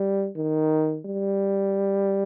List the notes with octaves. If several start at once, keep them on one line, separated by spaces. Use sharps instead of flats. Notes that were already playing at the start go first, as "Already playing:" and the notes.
Already playing: G3
D#3
G3